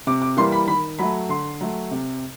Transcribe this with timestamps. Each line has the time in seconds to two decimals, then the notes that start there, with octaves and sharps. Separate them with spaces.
0.07 C3 D6
0.22 D6
0.37 E3 G3 A#3 C6
0.52 B5
0.68 D#3 B5
0.99 F#3 A3 B5
1.29 D3 C6
1.61 F#3 A3
1.91 C3